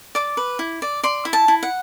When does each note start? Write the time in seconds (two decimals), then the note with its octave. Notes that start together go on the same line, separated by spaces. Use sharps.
0.15 D5 D6
0.37 B4
0.59 E4
0.82 D5
1.03 D5 C6
1.25 E4
1.33 A5
1.48 E4
1.63 F#5